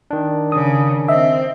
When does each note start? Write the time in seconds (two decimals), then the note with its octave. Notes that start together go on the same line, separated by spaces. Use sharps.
0.11 D#3 D4
0.52 C#3 D#6
1.08 C4 D#5 E5